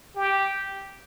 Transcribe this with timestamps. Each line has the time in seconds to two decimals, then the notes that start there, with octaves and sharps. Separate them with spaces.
0.16 G4